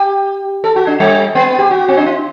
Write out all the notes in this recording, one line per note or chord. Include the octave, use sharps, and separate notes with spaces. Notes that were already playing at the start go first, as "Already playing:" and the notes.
Already playing: G4
A4
F#4
D4
G3
B3
G4
F#4
C4
D4
E4